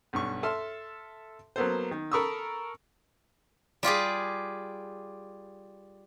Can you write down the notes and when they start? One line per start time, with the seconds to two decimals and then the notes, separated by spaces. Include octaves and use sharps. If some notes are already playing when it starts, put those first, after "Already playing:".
0.13 B1 G2 C#6
0.43 A4 E5 A5 C6 F6
1.56 F#3 A#3 B3 A4 C5
1.91 D#3
2.12 A4 A#4 B5 C#6 D#6 E6
3.83 G3 F4 G4 G#4